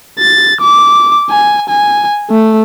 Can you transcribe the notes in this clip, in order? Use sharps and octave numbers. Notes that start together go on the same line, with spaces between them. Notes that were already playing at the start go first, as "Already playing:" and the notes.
A6
D6
G#5
G#5
A3